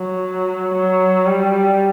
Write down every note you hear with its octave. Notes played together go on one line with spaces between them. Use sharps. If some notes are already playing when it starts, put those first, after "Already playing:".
Already playing: F#3
F#3
G3